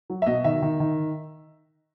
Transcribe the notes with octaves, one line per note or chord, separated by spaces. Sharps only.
F#3
E5
B2 D#5
D#3 E5
D#3
D#3